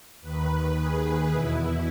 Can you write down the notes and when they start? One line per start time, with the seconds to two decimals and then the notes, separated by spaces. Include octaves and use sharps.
0.21 D#2 D#3 B4
0.75 G#4
1.29 E2 B2 E4